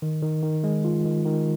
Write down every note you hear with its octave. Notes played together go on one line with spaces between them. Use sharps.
D#3
D#3
D#3
G#3
F4
D#3
D#3